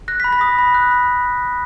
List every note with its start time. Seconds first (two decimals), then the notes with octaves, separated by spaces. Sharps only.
0.08 F#6 A#6
0.20 B5 B6
0.32 A#6
0.41 D#6
0.59 B5
0.74 F#6
0.91 B5